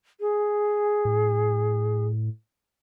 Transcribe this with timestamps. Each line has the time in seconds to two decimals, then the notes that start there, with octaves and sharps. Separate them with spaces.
0.20 G#4
1.05 A2